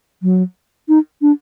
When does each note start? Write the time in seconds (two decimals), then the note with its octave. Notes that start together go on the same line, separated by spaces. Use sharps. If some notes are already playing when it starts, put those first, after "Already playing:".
0.23 F#3
0.89 D#4
1.22 D4